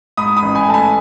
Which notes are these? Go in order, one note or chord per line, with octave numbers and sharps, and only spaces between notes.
G#2 B5 D#6
B5 D#6
A1
G#5 B5
A3 A5
G#5 B5